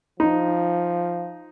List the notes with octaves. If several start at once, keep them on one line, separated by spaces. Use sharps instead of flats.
F3 D#4